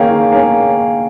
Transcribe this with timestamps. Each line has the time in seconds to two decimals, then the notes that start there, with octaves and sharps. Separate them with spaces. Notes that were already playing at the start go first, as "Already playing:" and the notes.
Already playing: D#3 A#3 C#4 G#4 F5 G5 G#5
0.11 D#3
0.32 A#3 C#4 G#4